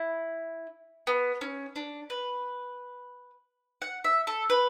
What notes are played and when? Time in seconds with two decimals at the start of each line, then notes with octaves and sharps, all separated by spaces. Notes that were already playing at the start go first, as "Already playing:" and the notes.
Already playing: E4
1.07 B3
1.41 C#4
1.76 D4
2.10 B4
3.82 F#5
4.04 E5
4.27 A4
4.50 B4